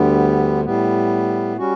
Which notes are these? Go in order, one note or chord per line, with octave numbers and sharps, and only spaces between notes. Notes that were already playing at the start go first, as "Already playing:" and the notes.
Already playing: D2 D3 G3 B3
A2 G3 B3
G3 C#4 F#4